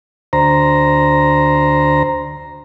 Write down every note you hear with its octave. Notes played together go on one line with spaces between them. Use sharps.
D2 C5 A#5